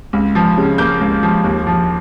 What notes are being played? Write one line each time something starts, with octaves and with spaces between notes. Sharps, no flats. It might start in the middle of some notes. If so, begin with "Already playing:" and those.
C#2
F3
C#3
A#3 G6
C#2
F3
D#2
F3